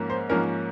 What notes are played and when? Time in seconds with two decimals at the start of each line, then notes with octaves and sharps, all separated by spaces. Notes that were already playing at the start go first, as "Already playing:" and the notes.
Already playing: G#2 F3 A#3 C#4
0.10 C5
0.29 G#2 F3 A#3 C#4 A#4